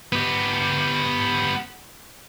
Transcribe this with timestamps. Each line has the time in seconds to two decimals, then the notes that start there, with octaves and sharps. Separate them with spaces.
0.13 B3 G4